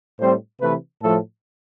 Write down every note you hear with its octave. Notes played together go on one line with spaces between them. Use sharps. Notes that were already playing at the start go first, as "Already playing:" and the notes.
A2 G3 C4 C5
C3 E3 A3 B4
A2 F3 A3 A4